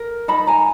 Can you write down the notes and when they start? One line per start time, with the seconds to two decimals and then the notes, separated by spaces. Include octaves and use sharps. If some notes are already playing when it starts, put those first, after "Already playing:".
Already playing: A#4
0.28 D#4 A5 B5
0.47 G#5 A#5